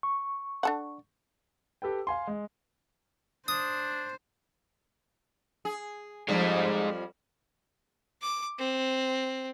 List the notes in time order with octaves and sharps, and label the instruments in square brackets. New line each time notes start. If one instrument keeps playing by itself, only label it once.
[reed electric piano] C#6
[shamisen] D4 A4 F#5
[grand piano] G4 A4 B4 G5
F5 G#5 C6
G#3
[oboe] D4 [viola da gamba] C5 [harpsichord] D#6
[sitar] G#4
[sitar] F2 F3 G3 [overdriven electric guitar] G#3 D#4
[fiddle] D6
C4